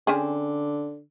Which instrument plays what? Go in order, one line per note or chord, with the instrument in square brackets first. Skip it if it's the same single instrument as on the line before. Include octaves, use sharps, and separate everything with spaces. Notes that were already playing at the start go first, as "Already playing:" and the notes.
[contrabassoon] D3 [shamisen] C4 C#4 G#4